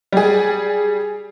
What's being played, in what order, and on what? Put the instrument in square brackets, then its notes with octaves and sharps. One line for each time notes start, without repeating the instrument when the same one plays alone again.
[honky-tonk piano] G3 G#4